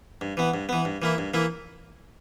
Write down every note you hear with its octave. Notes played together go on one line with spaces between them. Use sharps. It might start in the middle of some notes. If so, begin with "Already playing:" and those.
G2
E3 B3
G2
E3 B3
G2
E3 A#3 E4
G2
E3 A#3 E4